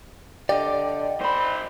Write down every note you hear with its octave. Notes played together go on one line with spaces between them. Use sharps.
D3 G4 D5 D#5
D#3 C5 B5